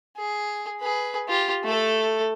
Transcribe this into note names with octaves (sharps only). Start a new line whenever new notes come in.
G#4
G#4 B4
F4 G4
A3 A4